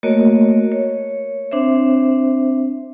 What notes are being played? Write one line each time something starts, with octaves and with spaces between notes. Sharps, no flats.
A3 A#3 F#4 A#4 C#5 D#5
C#5
C4 D4 C5 E5